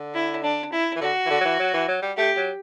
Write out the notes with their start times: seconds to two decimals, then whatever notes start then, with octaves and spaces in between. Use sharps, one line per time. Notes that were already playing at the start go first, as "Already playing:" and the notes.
Already playing: D3
0.14 E4
0.43 D4
0.72 E4
0.96 E3
1.01 D3 F#4
1.26 E3
1.30 D3
1.41 F#3
1.45 E3
1.59 F#3
1.74 E3
1.88 F#3
2.02 G3
2.16 A3 G4
2.37 F#3